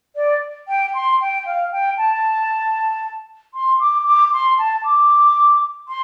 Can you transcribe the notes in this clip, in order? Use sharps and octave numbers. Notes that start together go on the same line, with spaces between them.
D5
G5
C6
G5
F5
G5
A5
C6
D6
D6
C6
A5
D6
C6